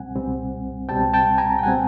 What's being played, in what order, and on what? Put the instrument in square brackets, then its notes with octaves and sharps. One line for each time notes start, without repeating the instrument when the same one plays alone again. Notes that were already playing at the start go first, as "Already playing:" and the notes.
Already playing: [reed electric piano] C2 B2 G3 C4 F#5 G#5
C2 B2 G3 C4
C2 B2 G3 C4 G5 A5
G5 A5
G#5 A#5
G5
B2 G3 C4 F#5 G#5